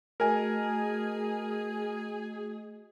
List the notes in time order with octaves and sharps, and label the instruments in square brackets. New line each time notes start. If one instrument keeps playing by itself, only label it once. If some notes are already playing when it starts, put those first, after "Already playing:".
[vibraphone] A3 F#4 D#5 [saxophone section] G#4 [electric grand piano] A#4 G#5